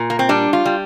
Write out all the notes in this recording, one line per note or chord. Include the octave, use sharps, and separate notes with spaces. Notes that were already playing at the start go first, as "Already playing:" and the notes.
Already playing: A#2
A#3
C4
G3 D4
F4
G3